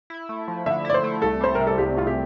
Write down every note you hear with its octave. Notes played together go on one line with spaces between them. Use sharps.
E4
A3
F3
D3 E5
E4 D5
C5
A3
C2 A4
G3 C5
C3 A#4
A4
C2 G4
C2 F4
G4